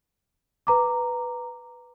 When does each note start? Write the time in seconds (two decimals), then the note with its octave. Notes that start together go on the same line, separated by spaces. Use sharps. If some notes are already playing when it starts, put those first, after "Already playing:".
0.67 B4 A#5 D6